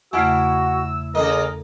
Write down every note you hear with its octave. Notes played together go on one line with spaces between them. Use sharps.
E2 C#3 A3 E4 F#4 E6
C#3 F#3 A4 A#4 D#5